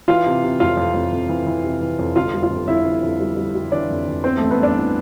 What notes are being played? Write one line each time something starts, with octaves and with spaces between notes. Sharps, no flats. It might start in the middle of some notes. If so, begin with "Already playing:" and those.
E3 F4 F5
C3
C3
F2 F4 F5
F2
F2
F2
E3
E3
C3
E3
F2
G1 F4 F5
G3
F4 F5
F2
G1 E4 E5
G1
F2
G3
G3
G3
E3 D4 D5
F2
E3
B3 C4 C5
A3 A4
A1
B3 B4
G2 D4 D5
E3